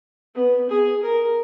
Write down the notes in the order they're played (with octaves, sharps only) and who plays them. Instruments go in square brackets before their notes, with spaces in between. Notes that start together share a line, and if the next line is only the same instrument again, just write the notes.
[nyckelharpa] B3
G#4
A#4